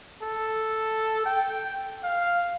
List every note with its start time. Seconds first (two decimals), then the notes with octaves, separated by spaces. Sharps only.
0.22 A4
1.26 G5
2.04 F5